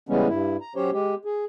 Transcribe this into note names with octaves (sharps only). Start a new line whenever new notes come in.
C#3 E3 G3 G#3 B3 C#4
G2 E4
A#5
F#3 C#4 G4 C5 C#5
G#3 G4
G#4